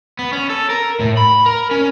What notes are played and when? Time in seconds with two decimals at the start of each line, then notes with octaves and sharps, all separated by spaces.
0.19 B3
0.33 C#4
0.50 A4
0.70 A#4
1.00 A2
1.17 B5
1.46 A#4
1.71 C#4